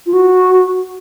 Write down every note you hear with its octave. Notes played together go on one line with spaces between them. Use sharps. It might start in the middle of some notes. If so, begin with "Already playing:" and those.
F4
F#4